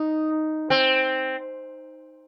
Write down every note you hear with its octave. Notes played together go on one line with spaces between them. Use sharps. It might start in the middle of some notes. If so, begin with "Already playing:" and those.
Already playing: D#4
C4